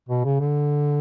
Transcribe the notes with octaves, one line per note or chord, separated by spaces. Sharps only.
B2
C#3
D3